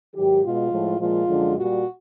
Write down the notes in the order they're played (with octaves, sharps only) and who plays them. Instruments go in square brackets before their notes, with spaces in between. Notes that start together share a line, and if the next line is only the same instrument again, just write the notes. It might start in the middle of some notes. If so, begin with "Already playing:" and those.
[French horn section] G#2 D#3 F#3 G4
B2 G#3 F4
A2 F3 G#3
A#2 F3 G#3 F4
F#2 D3 F3 G#3
A#2 G3 F#4